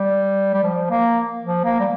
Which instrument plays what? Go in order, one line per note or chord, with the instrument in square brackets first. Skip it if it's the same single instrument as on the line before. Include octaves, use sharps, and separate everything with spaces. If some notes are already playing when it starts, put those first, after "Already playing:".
Already playing: [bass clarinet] G3
G3
F3
A#3
F3
A#3
G3